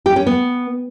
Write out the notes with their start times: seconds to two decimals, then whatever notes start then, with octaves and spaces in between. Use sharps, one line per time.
0.06 G4
0.16 C#4
0.26 B3